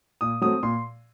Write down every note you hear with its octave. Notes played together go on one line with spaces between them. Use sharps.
A#2 D#6
F#3 A3 C4 D#6
A#2 C6